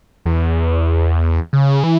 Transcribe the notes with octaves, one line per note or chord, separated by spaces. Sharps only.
E2
C#3
E3